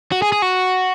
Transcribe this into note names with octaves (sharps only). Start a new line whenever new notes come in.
F#4
G#4
G#4
F#4